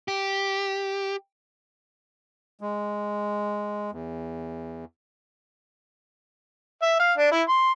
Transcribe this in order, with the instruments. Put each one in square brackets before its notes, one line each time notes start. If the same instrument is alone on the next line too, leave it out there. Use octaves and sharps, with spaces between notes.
[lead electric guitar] G4
[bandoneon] G#3
E2
[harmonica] E5
F5
D4
E4
C6